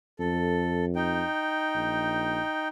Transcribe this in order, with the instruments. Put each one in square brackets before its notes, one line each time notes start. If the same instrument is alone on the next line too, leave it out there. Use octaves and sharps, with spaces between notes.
[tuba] F2 [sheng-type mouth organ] A4
[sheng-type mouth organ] D#4 G5
[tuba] A#1